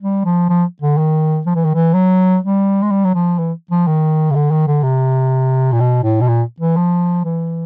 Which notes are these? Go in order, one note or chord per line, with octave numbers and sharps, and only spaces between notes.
G3
F3
F3
D3
D#3
F3
E3
D#3
E3
F#3
G3
G#3
G3
F#3
F3
E3
F3
D#3
C#3
D3
D#3
D3
C3
A#2
B2
A2
B2
A#2
E3
F3
E3